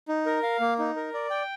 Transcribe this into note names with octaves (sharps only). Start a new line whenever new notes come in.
D#4
A#4
F5
A#3
D#4
A#4
D5
G5